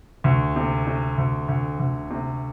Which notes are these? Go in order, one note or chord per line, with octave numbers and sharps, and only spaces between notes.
D2
C3
C3
D2
D2
D2
C3